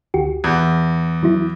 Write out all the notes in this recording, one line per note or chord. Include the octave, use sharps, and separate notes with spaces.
D2 F#4 G4
E2 G#6
E3 F#3 E4